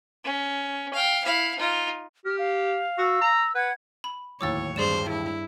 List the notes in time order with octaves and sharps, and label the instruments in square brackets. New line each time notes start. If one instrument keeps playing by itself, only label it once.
[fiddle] C#4
F5 G5
E4 F5
D#4 F4
[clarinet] G4 [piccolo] F6
[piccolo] F5
[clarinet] F#4 [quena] E6
[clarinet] A#5
[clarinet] B4 [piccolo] F#5 [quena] G#6
[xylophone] B5
[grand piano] D1 D#2 A2 [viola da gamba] C#5 [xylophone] D6 E6 A6
[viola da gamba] G2 C5 [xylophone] G#4 D5 E7
[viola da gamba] E4